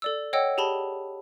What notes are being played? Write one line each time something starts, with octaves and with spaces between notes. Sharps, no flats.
A4 D5 E6
C#5 D#5 F#5 G5 E6
G4 G#4 A5 B5 G7